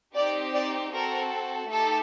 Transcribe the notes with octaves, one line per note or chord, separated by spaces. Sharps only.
C4 D#4 G4 D5
D5
C4 F#4 A4 A#4
A3 D#4 G4 A4